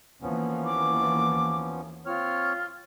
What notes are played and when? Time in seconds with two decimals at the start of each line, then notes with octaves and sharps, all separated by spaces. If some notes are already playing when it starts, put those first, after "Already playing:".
0.22 D#2 E3 F3 A#3 B3 C#4
0.65 D6
2.06 C4 F4 C#5 F6